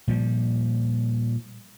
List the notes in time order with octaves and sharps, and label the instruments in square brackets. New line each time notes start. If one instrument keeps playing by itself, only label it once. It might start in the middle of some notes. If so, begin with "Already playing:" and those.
[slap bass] A#2 F3 G3